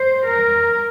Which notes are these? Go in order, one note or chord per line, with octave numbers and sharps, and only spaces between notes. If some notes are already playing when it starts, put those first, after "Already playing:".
Already playing: C5
A#4